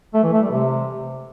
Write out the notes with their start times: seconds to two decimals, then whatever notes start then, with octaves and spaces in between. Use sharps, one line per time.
0.14 A3
0.23 E3
0.32 A3
0.42 G3
0.51 C3